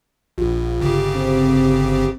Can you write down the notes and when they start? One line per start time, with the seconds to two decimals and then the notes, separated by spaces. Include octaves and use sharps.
0.38 A#1 F4
0.80 G1 C#3 G4
1.15 C4